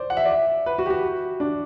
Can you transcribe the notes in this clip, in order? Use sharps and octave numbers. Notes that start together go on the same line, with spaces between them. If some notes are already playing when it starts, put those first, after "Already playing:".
Already playing: C5 D5
F#5
E5
D5
E5
B4
F#4
G4
F#4
D4